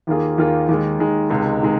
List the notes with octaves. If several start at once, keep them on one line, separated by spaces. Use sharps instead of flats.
D#2 D#3 A#3 F4 G#4
D#2 D#3 A#3 F4 G#4
D#2 D#3 G#3
D#2 D#3 G#3
C#2 C3 D#3 G#3
C3 D#3 G#3